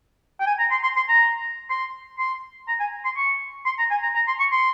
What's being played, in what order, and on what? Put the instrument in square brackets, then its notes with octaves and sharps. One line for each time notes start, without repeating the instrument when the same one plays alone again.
[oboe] G5
G#5
A#5
C6
C6
C6
A#5
C6
C6
A#5
G#5
C6
C#6
C6
A#5
G#5
A#5
A#5
C6
C#6
C6